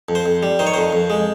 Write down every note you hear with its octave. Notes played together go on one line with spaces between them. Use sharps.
F2
C5
F2
G3
D#3 C5
C#5
F2 C5
F2
G#3